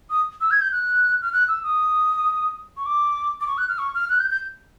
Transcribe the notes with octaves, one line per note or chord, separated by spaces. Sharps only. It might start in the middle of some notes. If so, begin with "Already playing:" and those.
D#6
E6
G#6
G6
F#6
F6
F#6
E6
D#6
C#6
D6
D6
C#6
F#6
F6
C#6
F6
F#6
G6
G6